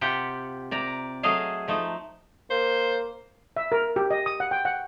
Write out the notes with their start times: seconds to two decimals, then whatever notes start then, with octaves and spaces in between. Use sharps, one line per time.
0.01 C3 F4 G4 F#5 G5
0.71 C3 D5 A#5
1.23 F#3 A3 G#4 D#5 F5
1.68 F3 A3 D#4
2.50 A#3 C5
3.56 E5
3.72 A#4
3.96 G4
4.11 D#5
4.26 D#6
4.40 F#5
4.51 G5
4.65 F#5